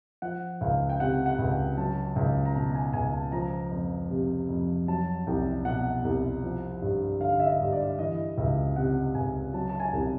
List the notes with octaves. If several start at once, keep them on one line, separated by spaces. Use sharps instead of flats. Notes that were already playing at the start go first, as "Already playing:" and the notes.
F3 F#5
C#2 F5
G5
C3 F#5
F#5
C#2
G5
F#3 A5
C#2
A#5
B2 A5
G#5
C#2 G#5
A5
F3 A#5
F2
C3
F2
F#3 A5
C2 G5
B2 F#5
C2
F3
G2
D3 F5
F5
E5
D#5
G2
D5
E3 D#5
C#2 E5
C3 F#5
C#2 G#5
F#3 A5
A5
G#5
C2